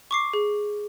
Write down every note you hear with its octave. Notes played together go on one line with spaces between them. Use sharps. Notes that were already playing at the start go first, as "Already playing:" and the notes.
C#6 D6 C7
G#4